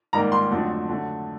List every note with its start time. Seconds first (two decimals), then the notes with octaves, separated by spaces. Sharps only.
0.13 G#2 D#3 G3 A#3 A#5
0.32 C6
0.51 F2 D3 F#3 A3 C4
0.89 D3 F#3 A3